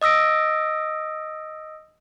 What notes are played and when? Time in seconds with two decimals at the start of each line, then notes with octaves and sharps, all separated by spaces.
0.02 D#5 D#6 E6 A#6 D7